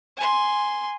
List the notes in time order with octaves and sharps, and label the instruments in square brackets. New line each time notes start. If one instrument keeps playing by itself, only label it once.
[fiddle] G#5 C6